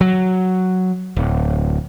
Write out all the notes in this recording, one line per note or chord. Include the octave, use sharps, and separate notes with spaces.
F#3
D1